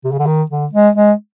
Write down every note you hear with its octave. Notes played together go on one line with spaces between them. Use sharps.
C3
C#3
D3
D#3
D3
G#3
G#3